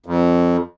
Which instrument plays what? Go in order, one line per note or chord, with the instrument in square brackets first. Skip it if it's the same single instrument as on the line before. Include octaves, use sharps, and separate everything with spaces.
[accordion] F2